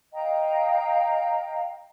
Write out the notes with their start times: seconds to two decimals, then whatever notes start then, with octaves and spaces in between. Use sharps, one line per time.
0.13 D#5 F5 G5 A#5